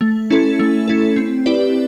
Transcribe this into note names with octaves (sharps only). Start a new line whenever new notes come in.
A3
C#4 E4 A4
A3
C#4 E4 A4
C4
E4 G4 B4 D5